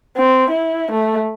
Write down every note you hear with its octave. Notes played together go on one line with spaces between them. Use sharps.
C4
E4
A3